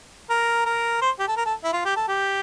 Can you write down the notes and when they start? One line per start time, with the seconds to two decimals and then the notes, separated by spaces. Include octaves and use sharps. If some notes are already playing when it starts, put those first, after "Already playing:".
0.30 A#4
0.66 A#4
1.02 C5
1.19 G4
1.28 A4
1.37 A#4
1.46 A4
1.64 E4
1.73 F4
1.85 G4
1.96 A4
2.08 G4